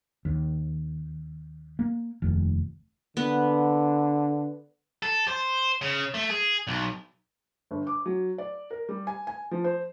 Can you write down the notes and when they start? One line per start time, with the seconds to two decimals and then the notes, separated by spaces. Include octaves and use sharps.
0.25 D#2
1.79 A#3
2.22 F1 D#2
3.17 D3 B3
5.03 A4
5.28 C5
5.82 C#3
6.14 A3
6.30 G#4
6.67 B1
7.71 G1
7.87 D6
8.06 F#3
8.38 D5
8.70 A#4
8.89 G3
9.07 G#5
9.27 G#5
9.51 F3
9.64 C5